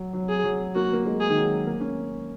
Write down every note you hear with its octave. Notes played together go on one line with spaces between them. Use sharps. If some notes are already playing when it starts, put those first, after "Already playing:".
Already playing: F#3
F#3
G#4
F#3
A#3 F#4
A#3
G#3
G#4
D#3
F#3
A#3
C#4